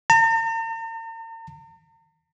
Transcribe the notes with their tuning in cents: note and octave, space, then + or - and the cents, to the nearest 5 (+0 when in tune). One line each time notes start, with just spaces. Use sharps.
A#5 -45